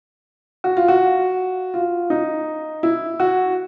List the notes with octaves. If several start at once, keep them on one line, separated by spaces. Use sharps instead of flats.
F#4
F4
F#4
F4
D#4
E4
F#4